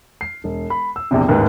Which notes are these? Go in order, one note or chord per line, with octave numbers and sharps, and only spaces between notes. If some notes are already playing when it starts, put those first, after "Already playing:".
C7
E1
B5
E6
A#1 E2 C3
A1 D#2 G#2 D#3 B4